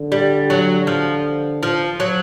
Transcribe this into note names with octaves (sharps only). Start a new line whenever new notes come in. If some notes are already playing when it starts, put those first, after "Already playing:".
Already playing: D3
G3
F#3
F3
F3
F#3